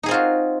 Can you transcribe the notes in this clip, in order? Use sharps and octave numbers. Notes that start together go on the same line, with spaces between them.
C4 D#4 F4 F#4 G#4